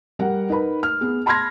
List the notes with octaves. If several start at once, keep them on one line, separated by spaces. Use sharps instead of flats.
G3 A#4 F#5
D#4 A#4 B4 B5
F6
B3 G#4
A5 B5 C6 F6 G#6 A#6